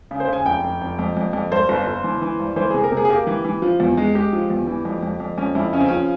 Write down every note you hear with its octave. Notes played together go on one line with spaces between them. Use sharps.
C#3
C5
C#3 G#5
F1 G5
F1
F1
F2
F2
F2
G2 C5
G1
G1
E3
E3
G2
E3 C5
C3 G#4
A#4
C3 G#4
G#4
A#3 G4
E3
E3
F3
E2
G#3
G#3 G4
F3
E2
E3
F2
F2
F2
F2 C#4
F2 E4
C#3 C#4
C4
F3 C#4